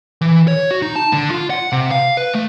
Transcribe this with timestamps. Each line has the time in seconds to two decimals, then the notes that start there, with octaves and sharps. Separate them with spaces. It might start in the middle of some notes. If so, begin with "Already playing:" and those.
0.21 E3
0.48 C#5
0.71 F#4
0.82 D#4
0.96 A5
1.13 D3
1.31 F4
1.50 F#5
1.72 C3
1.91 F5
2.17 B4
2.35 A3